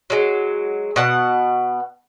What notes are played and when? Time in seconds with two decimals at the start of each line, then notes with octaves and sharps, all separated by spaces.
0.10 F#3 G#3
0.96 B2 F#5 A5